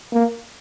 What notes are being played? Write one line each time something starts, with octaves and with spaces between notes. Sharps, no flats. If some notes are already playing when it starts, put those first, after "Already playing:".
A#3